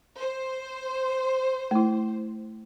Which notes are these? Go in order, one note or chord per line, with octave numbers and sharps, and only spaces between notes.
C5
A3 E4